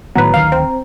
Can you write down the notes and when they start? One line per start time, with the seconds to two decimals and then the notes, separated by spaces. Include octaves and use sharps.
0.15 A2 D#3 F#3 B3 B4 A#5
0.34 D1 D#3 F5
0.52 C4